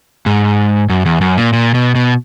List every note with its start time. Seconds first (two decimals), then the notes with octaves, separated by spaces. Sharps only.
0.26 G#2
0.90 F#2
1.06 E2
1.21 F#2
1.37 A#2
1.53 A#2
1.74 B2
1.95 B2